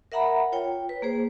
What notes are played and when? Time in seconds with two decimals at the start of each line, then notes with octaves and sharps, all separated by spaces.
0.12 A#4 E5 F#5 A#5 B5
0.52 F4 C#5 G5
0.89 B4
1.02 A#3 G#4 C5